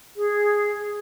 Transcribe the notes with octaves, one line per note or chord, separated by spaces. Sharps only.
G#4